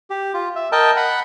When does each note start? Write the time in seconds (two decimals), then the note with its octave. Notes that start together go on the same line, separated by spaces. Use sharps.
0.10 G4
0.34 F4
0.56 E5
0.72 A#4 D#5 G5 A5
0.96 F#5 B5